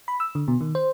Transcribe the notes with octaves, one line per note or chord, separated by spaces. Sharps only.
B5
E6
D3
B2
D#3
C5